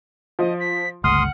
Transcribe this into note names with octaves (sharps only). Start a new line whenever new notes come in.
F3 D#5
B6
G1 C#2 A3 F#5 C6 D#6 F6